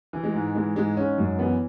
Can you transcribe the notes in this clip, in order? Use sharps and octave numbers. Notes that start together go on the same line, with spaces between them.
E3
G#3
G#2
E3 G#3
G#2 G#3
G#2 C#4
F#2
E3 B3